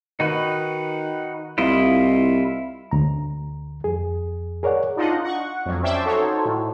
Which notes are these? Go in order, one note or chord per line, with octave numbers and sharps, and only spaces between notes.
D#3 D#4 F#4 B4
C2 E4 F4 D#5
D2 A#5
F2 G#4
G#4 A#4 C#5 D5 F#5
D4 D#4 F4 D#5 F#5
F#5 C#6
F2 F#3
C#4 C5 D5 E5 G5 A5
D#4 F#4 A4 C5 C#5
A2